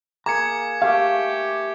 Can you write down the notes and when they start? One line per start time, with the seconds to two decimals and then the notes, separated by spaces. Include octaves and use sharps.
0.26 A#3 G#4 A#5 D6 G#6 C#7
0.82 A3 G4 F5 C#6